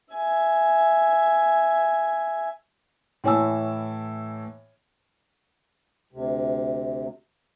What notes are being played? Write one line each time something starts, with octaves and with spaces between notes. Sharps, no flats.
E5 G#5
A2 E3 C#5 G#5 A5 E6
D2 C3